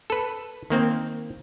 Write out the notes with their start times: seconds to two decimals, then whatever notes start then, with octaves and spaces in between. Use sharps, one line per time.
0.10 A4 B4
0.70 D#3 A#3 C4